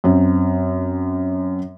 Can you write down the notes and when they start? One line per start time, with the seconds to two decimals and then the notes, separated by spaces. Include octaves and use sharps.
0.04 F#2 C4